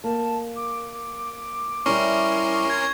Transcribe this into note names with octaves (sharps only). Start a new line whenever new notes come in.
A#3 A5
D6
G3 C#4 E4 A#4 C6 C#6
G#6